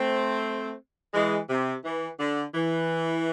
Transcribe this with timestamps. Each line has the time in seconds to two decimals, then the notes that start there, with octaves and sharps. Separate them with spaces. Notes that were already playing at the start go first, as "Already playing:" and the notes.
Already playing: A3 C4
1.14 E3 G#3
1.50 C3
1.85 E3
2.19 D3
2.55 E3